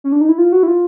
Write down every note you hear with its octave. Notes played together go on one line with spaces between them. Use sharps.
C#4
D4
D#4
E4
F4
F#4
E4
F4